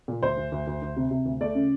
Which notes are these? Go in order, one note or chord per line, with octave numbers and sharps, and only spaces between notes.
A#2
D2 C5
D2
D2
D2
D2
C3
C3
D2
A3 D5
C#3